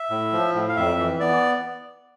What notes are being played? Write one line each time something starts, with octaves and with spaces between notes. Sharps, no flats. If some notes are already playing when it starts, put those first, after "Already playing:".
Already playing: E5
A2
F3
A2
F5
F2 E5
E3
B3 D5